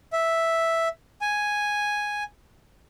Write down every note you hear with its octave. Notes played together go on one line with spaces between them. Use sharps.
E5
G#5